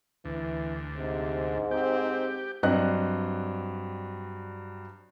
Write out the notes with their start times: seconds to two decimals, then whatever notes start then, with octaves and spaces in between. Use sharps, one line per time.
0.25 D2 E3
0.95 G#2 C3
1.71 C4 G4
2.63 G2 F#3 C4 D4 D#5 F#6